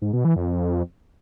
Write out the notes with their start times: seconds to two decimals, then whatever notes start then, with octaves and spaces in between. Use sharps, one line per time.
0.02 G#2
0.13 B2
0.25 E3
0.36 F2